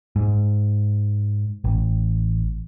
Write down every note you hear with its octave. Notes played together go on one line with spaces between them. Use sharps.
G#2
A1